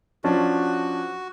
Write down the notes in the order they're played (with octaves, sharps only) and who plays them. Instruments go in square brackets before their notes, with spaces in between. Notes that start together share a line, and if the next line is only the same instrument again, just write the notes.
[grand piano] F3 C#4 D4 [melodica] F#4